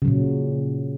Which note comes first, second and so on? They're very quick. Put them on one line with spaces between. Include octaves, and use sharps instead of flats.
C#3 F#3 A#2